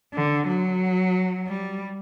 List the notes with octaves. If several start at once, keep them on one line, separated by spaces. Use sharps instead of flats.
D3
F#3
G3